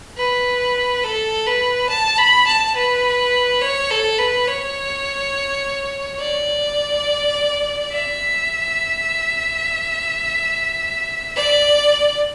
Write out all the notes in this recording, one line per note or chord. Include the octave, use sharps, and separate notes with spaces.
B4
A4
B4
A5
B5
A5
B4
C#5
A4
B4
C#5
D5
E5
D5